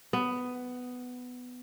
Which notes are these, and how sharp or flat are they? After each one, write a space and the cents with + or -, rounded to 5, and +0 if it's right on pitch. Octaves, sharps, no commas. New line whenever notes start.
B3 +10